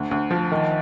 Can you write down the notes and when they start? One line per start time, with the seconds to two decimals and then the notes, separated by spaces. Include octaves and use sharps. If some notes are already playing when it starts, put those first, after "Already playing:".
Already playing: D2
0.11 D2
0.31 F3
0.52 D#3